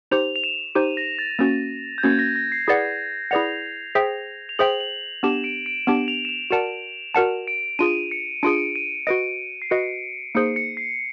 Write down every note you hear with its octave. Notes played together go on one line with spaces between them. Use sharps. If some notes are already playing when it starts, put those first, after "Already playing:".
D#4 G4 C5 F7
F7
E7
D#4 G4 C5 D#7
A#6
A6
A#3 C#4 F#4 A6
G6
A#3 C#4 F#4 G#6
A#6
A#6
C7
E4 G#4 B4 D5 F#5
E4 G#4 B4 D5 F#5 F7
G#4 C5 E5 G5
F7
G#4 C5 E5 G5 F#7
F#7
B3 D4 G4 E7
D7
D7
B3 D4 G4 E7
F7
E7
F7
F#4 A#4 D5 F#5 A5 E7
F#4 A#4 D5 F#5 A5
D7
D4 F4 G#4 D#7
C#7
D4 F4 G#4 D7
D#7
F#4 B4 D#5 D7
C7
F#4 B4 D#5 C#7
A#3 D#4 G#4 C5 C#7
C#7
C7